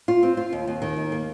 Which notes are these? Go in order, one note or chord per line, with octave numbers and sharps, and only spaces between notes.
F4
C4
F4
D#2
D#2
D#3
D#2
A#3